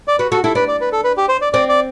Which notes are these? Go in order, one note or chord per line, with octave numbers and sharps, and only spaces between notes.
D5
F#4 B4
F#4 A4
E4 A4
D4 B4
D5
B4
A4
B4
G4
C5
D5
C4 D5
D5